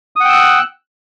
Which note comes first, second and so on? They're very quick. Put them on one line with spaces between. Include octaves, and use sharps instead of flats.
D#6 F#5 G5 E6 F#6